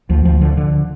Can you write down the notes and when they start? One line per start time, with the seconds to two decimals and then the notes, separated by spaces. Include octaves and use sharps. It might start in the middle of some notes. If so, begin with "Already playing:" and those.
0.09 D2 F3
0.25 D2 F3
0.41 D3 F3
0.57 D3